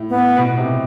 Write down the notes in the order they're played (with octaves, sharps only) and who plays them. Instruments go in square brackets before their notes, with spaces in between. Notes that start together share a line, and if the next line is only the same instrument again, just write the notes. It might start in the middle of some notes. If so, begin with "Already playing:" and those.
Already playing: [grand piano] A2
[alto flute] B3
[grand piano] B2
C3